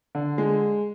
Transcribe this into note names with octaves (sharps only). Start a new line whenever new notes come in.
D3
G#3